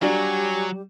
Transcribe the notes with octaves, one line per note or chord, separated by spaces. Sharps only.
F#3 G3 D4 F#4 G#5 C#6